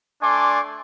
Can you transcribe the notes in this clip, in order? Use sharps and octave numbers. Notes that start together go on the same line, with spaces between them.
A3 D4 D5 G#5 C6 D6